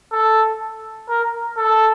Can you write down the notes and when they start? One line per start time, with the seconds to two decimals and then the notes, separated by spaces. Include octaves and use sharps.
0.12 A4
1.09 A#4
1.57 A4